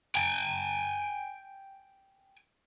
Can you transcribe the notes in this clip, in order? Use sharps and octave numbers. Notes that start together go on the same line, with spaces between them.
G5 G#5